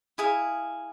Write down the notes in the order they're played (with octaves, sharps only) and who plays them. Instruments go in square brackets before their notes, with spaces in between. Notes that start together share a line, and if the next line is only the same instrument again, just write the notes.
[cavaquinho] E4 G#4 F5